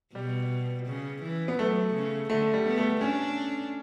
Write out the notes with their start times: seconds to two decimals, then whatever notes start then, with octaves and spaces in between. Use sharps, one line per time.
0.15 B2 G3
0.87 C#3
1.23 E3
1.48 B3
1.58 F#3 A3
1.94 C#3
2.30 D3 A3
2.54 G3
2.66 B3
2.78 A3
3.01 C#4 D4